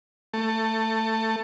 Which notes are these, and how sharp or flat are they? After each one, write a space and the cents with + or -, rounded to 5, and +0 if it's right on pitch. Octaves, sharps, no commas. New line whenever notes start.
A3 +15